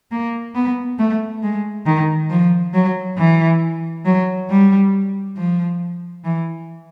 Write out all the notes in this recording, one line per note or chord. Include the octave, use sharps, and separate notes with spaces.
A#3
B3
A3
G#3
D#3
F3
F#3
E3
F#3
G3
F3
E3